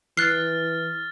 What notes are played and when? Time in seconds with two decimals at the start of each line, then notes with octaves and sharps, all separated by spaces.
0.17 E3 F6 F#6 A6 C7